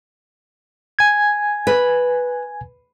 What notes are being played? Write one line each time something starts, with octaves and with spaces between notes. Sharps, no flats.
G#5 G#6
B4